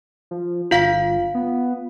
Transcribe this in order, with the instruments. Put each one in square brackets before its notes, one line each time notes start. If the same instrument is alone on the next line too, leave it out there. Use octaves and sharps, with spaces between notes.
[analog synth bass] F3
[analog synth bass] G1 [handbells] F4 F5 B6
[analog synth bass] B3